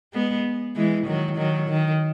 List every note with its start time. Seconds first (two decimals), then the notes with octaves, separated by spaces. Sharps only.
0.13 G#3 B3
0.76 E3 G#3
1.07 D#3 F#3
1.37 D#3 F#3
1.69 D#3